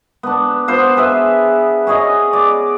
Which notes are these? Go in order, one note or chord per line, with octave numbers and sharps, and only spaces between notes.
B3 D4
B3 F4 C5
G#4 B4 E5
C#4 G#4 C#5 D#5
D5